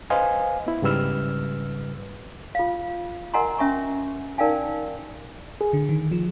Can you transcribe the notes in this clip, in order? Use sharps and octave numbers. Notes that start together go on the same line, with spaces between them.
B4 C5 D#5 F5 G#5
B3 E4
G#2 C#3 G3 B4 E6 F6
F4 F5
A#4 D#5 F#5 G#5 A#5 C6
C#4 E5 G#5 C#6
D#4 A#4 D5 F5 G5 G#5
G#4
D3
D#3
F3